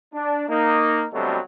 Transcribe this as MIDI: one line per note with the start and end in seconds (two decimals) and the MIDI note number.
0.14 0.45 62
0.49 1.05 58
0.49 1.05 63
1.13 1.38 47
1.13 1.38 50
1.13 1.38 54
1.13 1.38 55
1.13 1.38 57
1.13 1.38 60